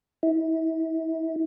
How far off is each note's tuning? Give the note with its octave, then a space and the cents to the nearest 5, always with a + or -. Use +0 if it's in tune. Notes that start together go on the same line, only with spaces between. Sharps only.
E4 -35